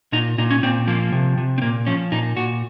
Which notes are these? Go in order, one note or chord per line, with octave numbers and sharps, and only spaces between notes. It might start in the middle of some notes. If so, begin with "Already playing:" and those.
A#2 D#4
A#2 D#4
C#4
A#2 C4
F3 A#3
C3
C3
C4
A#2 A#3
F3 C#4
A#2 D#4
A#2 F#4